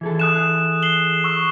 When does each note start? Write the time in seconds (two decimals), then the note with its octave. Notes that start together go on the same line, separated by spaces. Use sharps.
0.01 E3 G#4 A4
0.20 D#6 F#6 E7
0.83 C7 F#7 G7
1.24 C#6 E6